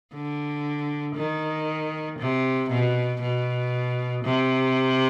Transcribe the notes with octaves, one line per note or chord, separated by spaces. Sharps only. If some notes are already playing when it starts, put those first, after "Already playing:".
D3
D#3
C3
B2
B2
C3